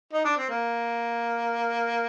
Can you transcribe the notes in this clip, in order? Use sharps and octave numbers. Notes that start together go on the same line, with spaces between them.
D#4
D4
C4
A#3